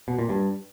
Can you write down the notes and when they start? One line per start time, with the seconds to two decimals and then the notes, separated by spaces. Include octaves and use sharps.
0.08 B2
0.19 A#2
0.29 G2